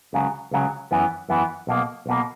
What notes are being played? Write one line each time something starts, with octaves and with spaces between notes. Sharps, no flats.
C#2 C#3 F#3
C#2 C#3 F#3
F#2 E3 B3
F#2 E3 B3
B1 B2 A#3
B1 B2 A#3